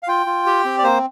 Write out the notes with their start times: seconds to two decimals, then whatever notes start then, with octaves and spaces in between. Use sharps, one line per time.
0.03 F5
0.08 F4 G5
0.26 F4
0.46 G4
0.65 C4
0.79 D5
0.83 A#3 C5